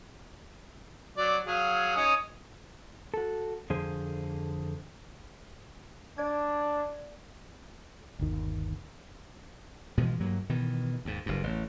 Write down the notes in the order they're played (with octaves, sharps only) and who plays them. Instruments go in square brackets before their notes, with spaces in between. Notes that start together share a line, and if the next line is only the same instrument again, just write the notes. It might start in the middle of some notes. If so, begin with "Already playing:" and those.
[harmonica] F#3 D5
F#3 G#4 F5
C#4 D#4 D#6
[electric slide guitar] F#4 A4
F2 D3 F3 G#4 C5
[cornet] D4 [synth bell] D5 G#6
[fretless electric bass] G1 D#2 D#3
[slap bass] B2 E3 F3 G#3
G2 F#3 A#3
B2 D#3 E3
D#2 G#2
F#1 G2
A1